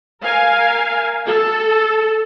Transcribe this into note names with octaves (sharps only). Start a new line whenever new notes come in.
A#4 F5 G#5
A4